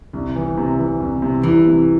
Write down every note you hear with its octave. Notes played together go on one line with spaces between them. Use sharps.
C2
E3
C3
E3
C2
C3
C2 E3
C3